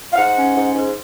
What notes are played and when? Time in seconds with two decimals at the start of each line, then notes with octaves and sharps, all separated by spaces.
0.13 F5
0.18 G#2 F#5
0.37 C#4
0.57 G#2
0.75 G#2